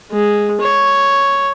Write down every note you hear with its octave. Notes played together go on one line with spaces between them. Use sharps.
G#3
C#5